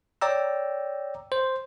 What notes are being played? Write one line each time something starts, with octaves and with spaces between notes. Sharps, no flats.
C#5 D5 G5 A#5 E6
C5